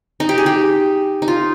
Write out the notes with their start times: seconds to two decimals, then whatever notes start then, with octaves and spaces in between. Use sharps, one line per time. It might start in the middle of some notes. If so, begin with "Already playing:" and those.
0.20 D#4
0.29 G4
0.38 G#4
0.46 G4
1.22 D#4
1.28 F4